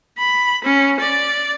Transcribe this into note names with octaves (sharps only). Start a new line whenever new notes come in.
B5
C#4
D5